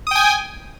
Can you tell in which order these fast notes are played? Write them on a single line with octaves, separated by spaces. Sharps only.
D#6 G5 G#5